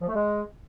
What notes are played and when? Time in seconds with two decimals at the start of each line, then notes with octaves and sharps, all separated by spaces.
0.01 F3
0.08 A3
0.15 G#3